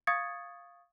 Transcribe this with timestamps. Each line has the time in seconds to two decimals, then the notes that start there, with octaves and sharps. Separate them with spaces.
0.07 F5 C#6 D#6 G#6 A6 C#7